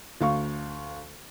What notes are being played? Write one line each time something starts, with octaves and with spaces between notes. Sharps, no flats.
D2 F5 C#6